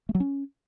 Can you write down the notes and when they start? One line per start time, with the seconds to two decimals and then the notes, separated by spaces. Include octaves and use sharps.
0.09 A3
0.15 F#3
0.20 C#4